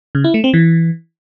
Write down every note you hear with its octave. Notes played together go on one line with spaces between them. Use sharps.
C#3
E4
A3
C4
E3